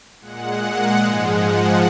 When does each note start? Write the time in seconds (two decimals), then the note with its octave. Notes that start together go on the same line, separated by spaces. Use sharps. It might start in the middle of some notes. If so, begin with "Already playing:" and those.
0.21 A#2 G#3 F#5
0.96 G#2 F3 G#3
1.33 F#5